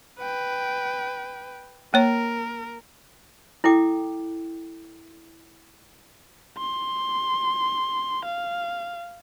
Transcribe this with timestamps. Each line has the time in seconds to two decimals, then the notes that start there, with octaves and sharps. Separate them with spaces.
0.19 B4 G5
1.94 A#3 A#4 C#5
3.64 E4 A4 G5 D6
6.58 C6
8.25 F5